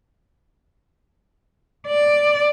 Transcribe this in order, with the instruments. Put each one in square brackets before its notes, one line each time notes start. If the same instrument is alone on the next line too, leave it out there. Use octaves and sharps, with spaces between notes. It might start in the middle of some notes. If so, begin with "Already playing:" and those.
[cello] D5